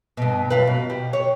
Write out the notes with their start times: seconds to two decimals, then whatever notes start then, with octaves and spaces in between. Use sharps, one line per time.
0.17 G2 B2
0.50 F#2 F4 B4
0.67 B2
0.90 G3
1.13 C#5